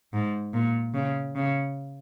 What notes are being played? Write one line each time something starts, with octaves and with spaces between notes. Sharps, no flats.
G#2
A#2
C#3
C#3